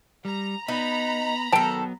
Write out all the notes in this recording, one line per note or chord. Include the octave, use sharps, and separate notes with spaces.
G3 A#5
B3 D#4 A#5 B5
D#3 F#3 B3 A4 G5 A5